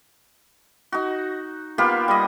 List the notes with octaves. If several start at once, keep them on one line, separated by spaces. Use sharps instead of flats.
D#4 F#4
A#3 B3 F4 G4
G3 D#5